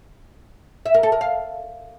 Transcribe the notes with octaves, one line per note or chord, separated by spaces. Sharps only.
E5
A#4
A4
A#4
F5